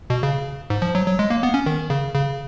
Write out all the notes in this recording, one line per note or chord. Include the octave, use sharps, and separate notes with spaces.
B2
C#3
G#2
F3
F#3
F#3
G#3
A#3
B3
C#4
D#3
C#3
C#3